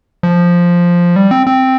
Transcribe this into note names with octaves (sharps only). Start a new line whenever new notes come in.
F3
G3
C4
C4